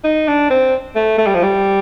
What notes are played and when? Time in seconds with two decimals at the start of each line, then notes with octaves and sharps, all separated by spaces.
0.04 D#4
0.28 D4
0.51 C4
0.96 A3
1.18 A3
1.27 G3
1.35 F3
1.43 G3